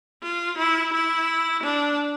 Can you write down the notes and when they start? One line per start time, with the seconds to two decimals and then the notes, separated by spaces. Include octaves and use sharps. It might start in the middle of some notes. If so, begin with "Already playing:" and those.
0.22 F4
0.58 E4
0.93 E4
1.63 D4